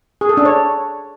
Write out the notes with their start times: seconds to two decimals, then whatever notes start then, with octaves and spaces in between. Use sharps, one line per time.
0.21 G#4
0.29 A4
0.37 D4
0.45 C#5